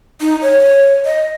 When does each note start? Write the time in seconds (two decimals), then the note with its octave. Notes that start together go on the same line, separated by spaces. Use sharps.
0.21 D#4
0.42 C#5
1.05 D#5